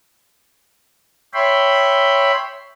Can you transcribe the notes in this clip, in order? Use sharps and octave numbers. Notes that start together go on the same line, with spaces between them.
C#5 E5 G5 B5 C6